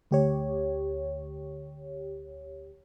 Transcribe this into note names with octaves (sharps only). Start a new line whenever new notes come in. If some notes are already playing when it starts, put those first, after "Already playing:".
D2 G4 C#5